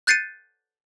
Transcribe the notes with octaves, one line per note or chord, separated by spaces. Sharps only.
F#6 G6 A6 C7 C#7 D#7